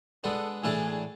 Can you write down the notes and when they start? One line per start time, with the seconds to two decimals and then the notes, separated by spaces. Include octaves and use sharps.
0.24 G#3 B3 D4 A4
0.63 A2 E3 A3 D4 G#4 A4